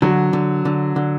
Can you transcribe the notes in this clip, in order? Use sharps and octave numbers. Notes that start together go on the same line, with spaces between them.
D3 F#3
D3
D3
D3